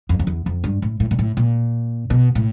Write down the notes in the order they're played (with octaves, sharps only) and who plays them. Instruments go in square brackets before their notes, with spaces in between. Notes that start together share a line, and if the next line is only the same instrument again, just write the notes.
[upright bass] F2
F2
E2
F2
G2
A2
A2
A#2
A2
A#2
B2
A2